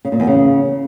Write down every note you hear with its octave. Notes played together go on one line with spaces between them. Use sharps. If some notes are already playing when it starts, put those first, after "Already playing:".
C#3
A#2
E2
C#3